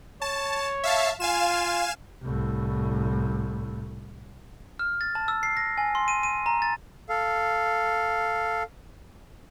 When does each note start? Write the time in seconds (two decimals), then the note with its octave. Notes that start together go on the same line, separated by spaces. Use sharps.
0.22 C#5 A5
0.84 E5 F5 A5
1.20 F4 F5 G#5 E7
2.23 C2 A2
4.79 F6
5.01 A6
5.15 A5
5.28 E6
5.43 C7
5.57 A#6
5.78 G#5
5.95 C6
6.08 D#7
6.23 D#7
6.46 A#5
6.62 A6
7.09 A4 F5